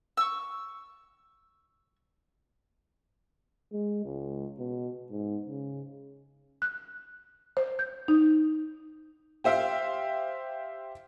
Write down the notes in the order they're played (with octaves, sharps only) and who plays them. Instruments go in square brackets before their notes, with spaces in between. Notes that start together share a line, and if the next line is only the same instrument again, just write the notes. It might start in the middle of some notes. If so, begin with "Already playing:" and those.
[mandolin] C#6 E6
[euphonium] G#3
C#2
B2
G#2
C#3
[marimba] F#6
C5
G6
D#4
[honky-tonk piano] G4 C5 E5 F5 G5